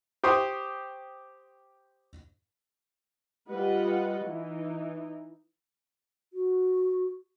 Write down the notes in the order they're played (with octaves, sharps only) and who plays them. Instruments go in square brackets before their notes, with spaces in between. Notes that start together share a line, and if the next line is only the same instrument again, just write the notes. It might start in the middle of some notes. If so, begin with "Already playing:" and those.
[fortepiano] G4 C5 C6 C#6 D#6
[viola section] G3 F4 B4 D#5 F#5
E3 D#4
[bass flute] F#4